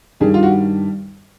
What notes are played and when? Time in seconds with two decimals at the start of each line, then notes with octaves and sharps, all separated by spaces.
0.20 G2 D#3 G3 G#4
0.34 F4
0.43 F#4